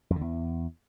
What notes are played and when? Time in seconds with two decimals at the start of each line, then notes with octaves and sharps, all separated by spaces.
0.10 F2
0.16 D3
0.21 E2